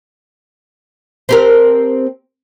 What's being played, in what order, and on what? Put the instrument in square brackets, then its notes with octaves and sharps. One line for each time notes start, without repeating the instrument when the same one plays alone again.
[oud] C4 G4 A#4